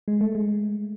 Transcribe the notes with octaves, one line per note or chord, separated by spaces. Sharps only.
G#3
A3
G#3